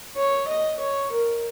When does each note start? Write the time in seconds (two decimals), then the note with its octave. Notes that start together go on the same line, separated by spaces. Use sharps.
0.16 C#5
0.48 D#5
0.80 C#5
1.12 A#4